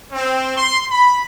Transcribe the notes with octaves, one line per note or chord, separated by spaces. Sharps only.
C4
C6
B5